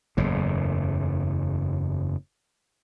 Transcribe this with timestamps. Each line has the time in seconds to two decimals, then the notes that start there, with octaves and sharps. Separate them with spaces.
0.17 F#1 E2 A2